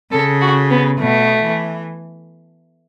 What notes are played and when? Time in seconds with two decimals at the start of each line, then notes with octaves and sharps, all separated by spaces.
0.12 C#3 A4
0.41 F#4
0.70 B3
0.99 B2 A3
1.42 E3